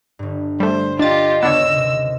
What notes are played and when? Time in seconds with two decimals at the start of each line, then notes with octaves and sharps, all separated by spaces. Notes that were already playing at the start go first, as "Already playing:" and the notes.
0.19 G1 G2
0.60 G3 A3 C5
0.99 D4 F4 G4 D#5 A6
1.43 D#2 C#3 B3 D4 C#5 E6
1.75 C3